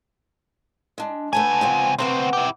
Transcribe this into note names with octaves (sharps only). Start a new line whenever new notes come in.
G#3 D4
C#2 A3 B3 G#5 A5
F3 B3 C4
D2 C3 B3 C4 F#5
E4 G4